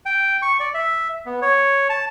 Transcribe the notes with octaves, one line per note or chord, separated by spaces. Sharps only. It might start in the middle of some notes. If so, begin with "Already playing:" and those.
G5
C#6
D5
E5
B3
C#5
A5